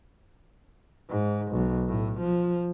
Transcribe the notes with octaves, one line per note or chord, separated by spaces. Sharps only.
G#2
B1
A2
F3